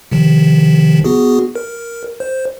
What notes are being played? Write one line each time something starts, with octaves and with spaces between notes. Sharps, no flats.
C3 D#3 F3
B3 F#4 G#4
A#4
C5